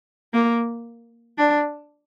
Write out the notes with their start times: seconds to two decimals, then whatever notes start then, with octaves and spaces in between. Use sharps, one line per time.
0.33 A#3
1.38 D4